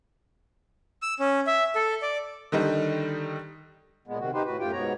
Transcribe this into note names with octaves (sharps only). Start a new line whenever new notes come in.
E6
C#4
E5
A4
D5
D3 D#3 G3 D#4
A#2 G#3 B3
C3 D#3 F#4
B3 D#4 G4 B4 C5
A2 F#4 B4
F#2 A2 F4 G4 G5
G#2 B2 B3 C#5 A#5